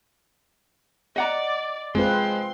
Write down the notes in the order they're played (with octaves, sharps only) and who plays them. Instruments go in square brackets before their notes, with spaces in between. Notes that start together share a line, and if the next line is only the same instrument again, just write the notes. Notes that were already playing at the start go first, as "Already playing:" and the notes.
[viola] D5 [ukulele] D#5 F#5 A#5
[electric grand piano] G#3 [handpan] C4 F4 B4 [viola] C6